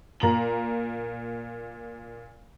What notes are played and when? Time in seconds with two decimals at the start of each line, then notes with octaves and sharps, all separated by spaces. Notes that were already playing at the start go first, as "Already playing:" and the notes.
0.20 A#2 A#5 F#7